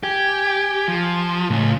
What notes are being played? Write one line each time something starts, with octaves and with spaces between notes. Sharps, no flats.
G4 G#5
F3
C#2 A2 C#4